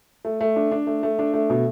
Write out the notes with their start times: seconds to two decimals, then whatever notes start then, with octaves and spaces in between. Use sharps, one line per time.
0.25 A3
0.41 A3
0.56 D4
0.71 D4
0.87 A3
1.03 A3
1.19 D4
1.34 A3
1.50 B2